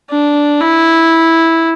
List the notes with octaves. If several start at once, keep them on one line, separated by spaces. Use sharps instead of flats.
D4
E4